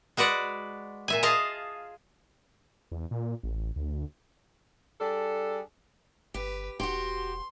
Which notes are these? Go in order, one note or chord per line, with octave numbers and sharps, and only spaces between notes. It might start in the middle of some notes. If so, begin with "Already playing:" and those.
G#3 F#4 B4 D5 F#5
A#2 E5 G#5
F4 G#4 D#5 F5 A5
E2
A#2
A1
D2
G3 D4 G#4 A4
G1 G4 B4
E1 F#4 G4 C6